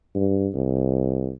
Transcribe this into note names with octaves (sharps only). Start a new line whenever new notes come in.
G2
C2